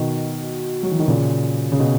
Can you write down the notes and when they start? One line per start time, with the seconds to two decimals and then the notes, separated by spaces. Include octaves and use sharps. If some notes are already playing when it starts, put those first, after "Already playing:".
Already playing: B2 D#3
0.83 F#3
0.91 E3
0.99 D#3
1.08 A#2 C#3
1.72 C#3
1.79 B2